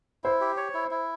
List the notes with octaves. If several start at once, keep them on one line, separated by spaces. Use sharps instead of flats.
E4 C5
G4
C#5
E4
E4